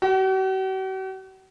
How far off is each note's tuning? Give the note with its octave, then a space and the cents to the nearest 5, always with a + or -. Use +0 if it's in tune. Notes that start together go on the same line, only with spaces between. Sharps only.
F#4 +45